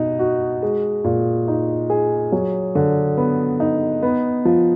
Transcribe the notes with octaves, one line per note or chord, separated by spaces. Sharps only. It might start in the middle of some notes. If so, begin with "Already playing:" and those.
Already playing: B2 D#4
F#4
G#3
A#2
D#4
G#4
F#3
D3
B3
D#4
B3
F3